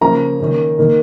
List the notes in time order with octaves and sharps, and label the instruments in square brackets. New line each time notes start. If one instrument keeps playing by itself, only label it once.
[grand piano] C#3 F3 A#3 A#5
D#3 A#3 C#4
D#3 A#3 D#4